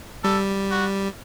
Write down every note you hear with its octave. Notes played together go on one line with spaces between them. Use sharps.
G3 A4
F#4